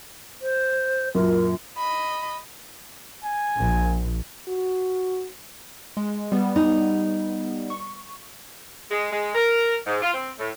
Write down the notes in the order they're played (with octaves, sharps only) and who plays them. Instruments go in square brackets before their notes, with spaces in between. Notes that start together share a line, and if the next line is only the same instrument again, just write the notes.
[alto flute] C5
[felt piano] F#2 A#2 [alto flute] A#4
[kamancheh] D#5 B5
[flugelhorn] G#5
[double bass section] A#1
[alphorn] F#4
[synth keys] G#3
G3 B3
[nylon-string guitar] D#4
[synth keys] C#6
[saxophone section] G#3
G#3
A#4
G#2
F4
C4
A2